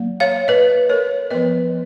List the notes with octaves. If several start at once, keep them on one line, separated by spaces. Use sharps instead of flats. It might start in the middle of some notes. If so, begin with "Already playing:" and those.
Already playing: F#3 A#3
C#5 F5
B4 D#5
A#4 C#5
F3 B3 B4 D#5